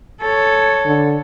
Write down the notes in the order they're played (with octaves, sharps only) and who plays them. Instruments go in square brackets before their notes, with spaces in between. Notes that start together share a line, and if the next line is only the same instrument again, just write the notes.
[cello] A4 C#5
[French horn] D3